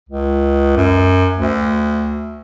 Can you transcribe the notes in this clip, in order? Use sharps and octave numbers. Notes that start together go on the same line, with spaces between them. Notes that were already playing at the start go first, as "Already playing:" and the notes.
C#2
F#2
D2